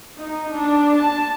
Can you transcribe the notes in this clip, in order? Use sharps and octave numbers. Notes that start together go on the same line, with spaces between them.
D#4
D4
A5